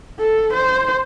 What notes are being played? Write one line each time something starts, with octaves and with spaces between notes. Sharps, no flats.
A4
C5